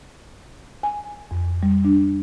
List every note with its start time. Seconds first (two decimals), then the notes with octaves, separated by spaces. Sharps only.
0.83 G#5
1.31 F2
1.63 G3
1.85 D4